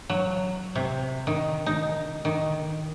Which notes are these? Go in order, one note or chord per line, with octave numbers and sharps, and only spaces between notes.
F#3
C3
D#3
D#4
D#3